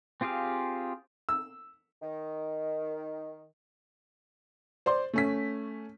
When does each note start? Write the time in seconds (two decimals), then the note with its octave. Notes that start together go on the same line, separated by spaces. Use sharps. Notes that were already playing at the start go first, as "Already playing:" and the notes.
0.21 C4 F4 G4 G#4 F5
1.29 E6
2.02 D#3
4.86 C5 D5 C6
5.14 A3 C#4 B6